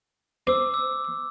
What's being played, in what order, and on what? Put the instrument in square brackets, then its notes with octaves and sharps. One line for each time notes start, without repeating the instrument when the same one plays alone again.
[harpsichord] C5 [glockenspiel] D6 E6
[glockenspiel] E6